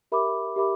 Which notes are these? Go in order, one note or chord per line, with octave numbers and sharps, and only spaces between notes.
G4 A#4 E5 B5 D6
G4 A#4 E5 B5 D6